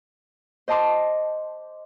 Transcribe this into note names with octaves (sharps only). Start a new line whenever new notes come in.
C5 D#5 A5 C6 D6